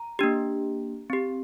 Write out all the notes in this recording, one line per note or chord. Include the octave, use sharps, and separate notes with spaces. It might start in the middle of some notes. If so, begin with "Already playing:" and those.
Already playing: A#5
A#3 D4 G4
C4 G4